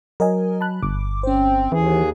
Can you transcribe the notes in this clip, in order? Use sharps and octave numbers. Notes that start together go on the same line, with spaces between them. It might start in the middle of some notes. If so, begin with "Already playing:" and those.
F#3 A#4 D#5 G#5
A5 B5 F#6
G1 D6
C4 C#4 C5
D#2 E3 G#4